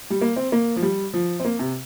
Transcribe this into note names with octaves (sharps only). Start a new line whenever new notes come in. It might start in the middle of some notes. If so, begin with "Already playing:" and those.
G3
A#3
C4
A#3
F3
G3
F3
C4
A#3
C3